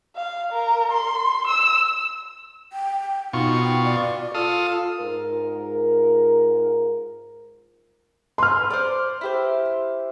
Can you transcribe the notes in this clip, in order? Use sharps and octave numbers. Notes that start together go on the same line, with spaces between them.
F5
A#4
C6
E6
G5
B2 D#4 F4 C#6
G5
D5
F4 A4 F5 D#6
G#2 F4 A#4
B4 C6 F6
C5 D5
E4 G4 C5